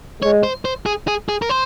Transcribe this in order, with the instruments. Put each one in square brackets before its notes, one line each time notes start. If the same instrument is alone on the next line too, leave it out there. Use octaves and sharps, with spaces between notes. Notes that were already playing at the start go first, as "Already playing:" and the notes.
[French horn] G#3 [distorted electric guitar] C#5
[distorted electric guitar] C5
C5
G#4
G#4
G#4
A#4
C5